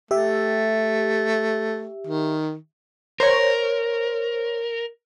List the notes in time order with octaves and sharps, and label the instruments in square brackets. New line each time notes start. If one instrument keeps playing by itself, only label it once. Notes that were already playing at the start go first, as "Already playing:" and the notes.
[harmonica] A3 [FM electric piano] G4 E5
[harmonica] D#3
[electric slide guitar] A#4 [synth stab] C5 C#5